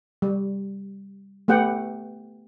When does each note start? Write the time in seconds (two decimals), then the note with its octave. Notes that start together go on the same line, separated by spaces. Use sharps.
0.22 G3
1.48 A3 B3 G4 F#5 G5